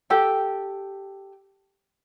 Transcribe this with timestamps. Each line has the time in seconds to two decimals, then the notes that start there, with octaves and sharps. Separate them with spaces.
0.10 G4 A4 G5